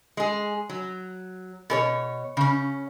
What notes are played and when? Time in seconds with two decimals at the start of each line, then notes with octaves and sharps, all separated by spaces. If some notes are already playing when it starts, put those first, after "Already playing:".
0.17 G#3 G#4
0.69 F#3
1.70 B2 A4 C#5
2.37 C#3 C#4